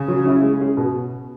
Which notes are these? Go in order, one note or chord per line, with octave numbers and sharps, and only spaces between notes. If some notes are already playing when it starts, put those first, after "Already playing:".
Already playing: C#3
F#3
C#4 E4
G#3
C#4 G#4
B2